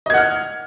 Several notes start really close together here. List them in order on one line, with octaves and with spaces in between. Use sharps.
D#5 G#6 F#5 F6